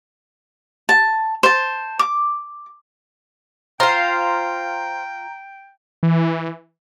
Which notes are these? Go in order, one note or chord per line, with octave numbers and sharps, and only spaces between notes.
A5
C5 A5
D6
F4 C5 F5 G5 A#5
E3